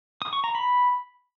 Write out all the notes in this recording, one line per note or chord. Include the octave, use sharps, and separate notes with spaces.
D#6
C#6
A#5
B5